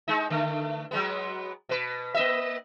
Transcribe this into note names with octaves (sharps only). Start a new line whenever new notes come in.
G#3 D#4
D3 A3
F#3 G#3 B3
B2 B4
A#3 D#5 E5